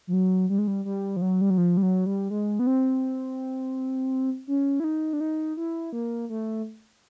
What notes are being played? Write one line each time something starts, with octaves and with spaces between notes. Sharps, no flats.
F3
F#3
G3
G#3
G3
G3
F3
F#3
G3
F#3
F3
G3
F#3
G3
G#3
B3
C4
C#4
E4
D#4
D4
D#4
E4
A#3
A3